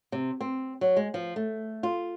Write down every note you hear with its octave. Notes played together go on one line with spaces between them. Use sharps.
C3
C4
F#3
G#3
F3
A3
F4